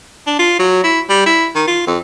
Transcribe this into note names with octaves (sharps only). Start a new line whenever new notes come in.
D4
F4
F#3
E4
G3
E4
D#3
F4
F2